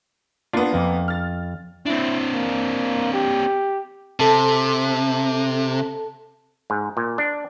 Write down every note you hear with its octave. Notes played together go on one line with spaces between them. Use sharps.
A#3 B3 D4 F4
F2
F6 A6
C4 D4 E4
A#3
G4
C3 A4 A5
G#2
A#2
D4